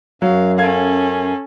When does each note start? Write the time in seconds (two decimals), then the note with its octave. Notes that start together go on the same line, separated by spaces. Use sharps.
0.22 F#2 F#3 F5
0.58 C#4 A4 F5 G#6